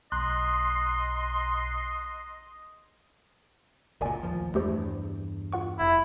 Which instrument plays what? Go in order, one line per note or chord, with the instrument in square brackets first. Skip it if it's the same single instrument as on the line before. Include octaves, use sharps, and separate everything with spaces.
[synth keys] B1 A#5 F#6 [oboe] D#5 [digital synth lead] C6
[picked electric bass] F#1 C#2 A#2 [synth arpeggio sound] A#4 D5 G#5
[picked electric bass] A1 D#2 F3
[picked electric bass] E2 G2 [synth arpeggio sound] A3 G4 C5
[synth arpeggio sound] F4 F#5 C#6
[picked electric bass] F1 [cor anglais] E4